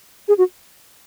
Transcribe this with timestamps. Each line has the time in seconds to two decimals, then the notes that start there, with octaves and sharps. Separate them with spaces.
0.28 G#4
0.38 F#4